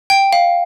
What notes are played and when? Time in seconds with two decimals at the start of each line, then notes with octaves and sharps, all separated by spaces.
0.10 G5
0.33 F5